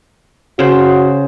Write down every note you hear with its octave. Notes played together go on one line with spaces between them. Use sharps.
C#3 F#4 C5